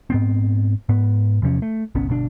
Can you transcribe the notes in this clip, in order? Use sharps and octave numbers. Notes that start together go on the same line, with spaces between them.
G#2 B3 C4
G#2 B3
E2 C3 F3 C#4
A3
G1 C2 B3 C#4
G1 B2 D3 D4